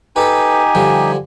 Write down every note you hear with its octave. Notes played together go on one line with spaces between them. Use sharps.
D#4 G4 A4 B4 G#5
D3 F3 G3